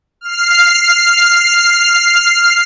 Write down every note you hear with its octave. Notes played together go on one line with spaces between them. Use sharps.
F6 C7